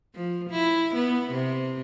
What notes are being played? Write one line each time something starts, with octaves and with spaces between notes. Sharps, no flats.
F3
E4
B3
C3